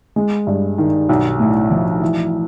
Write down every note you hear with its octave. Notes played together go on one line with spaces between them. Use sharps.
G#3
G2
D#3
B1
A2
F3
E3